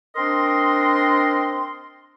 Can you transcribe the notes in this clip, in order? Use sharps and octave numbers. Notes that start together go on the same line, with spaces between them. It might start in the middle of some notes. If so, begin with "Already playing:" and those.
C4 D4 A#4 D#5 C6